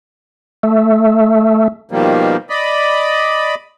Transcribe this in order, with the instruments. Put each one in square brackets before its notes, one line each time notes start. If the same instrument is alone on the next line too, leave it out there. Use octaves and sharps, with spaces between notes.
[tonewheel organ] A3
[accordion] B2 D#3 F3 G3 A#3
D5 D#5 B5